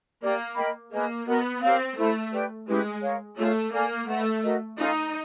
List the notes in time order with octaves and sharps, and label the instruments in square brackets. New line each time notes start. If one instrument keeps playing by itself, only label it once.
[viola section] A#3 [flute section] G4 A#4 D5
[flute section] A#4 D#5 G5 B5
[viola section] A#3 [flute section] G#4 B4 D#5
[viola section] B3 [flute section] F#4 A#4 D#5 F#5
[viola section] C4 [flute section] G4 A#4 C#5 F5
[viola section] A3 [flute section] E4 A4 C5
[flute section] G4 B4 D5 G5
[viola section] G#3 [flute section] C#4 E4 G4 B4
[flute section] A#4 C#5 F5
[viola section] A3 [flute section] F4 G#4 C#5
[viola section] A#3 [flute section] A4 D5 F5 G#5
[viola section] A3 [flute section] B4 D#5 F#5
[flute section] F#4 A#4 D#5
[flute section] C#4 F4 A4 [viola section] D#4